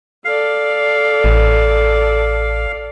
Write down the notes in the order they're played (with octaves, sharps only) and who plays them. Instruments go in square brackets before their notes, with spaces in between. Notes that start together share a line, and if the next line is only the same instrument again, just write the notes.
[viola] A4 D5 [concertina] F5
[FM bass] A1